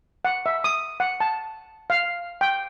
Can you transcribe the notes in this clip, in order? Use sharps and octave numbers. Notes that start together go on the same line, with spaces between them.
F#5
E5
D#6
F#5
A5
F5
G5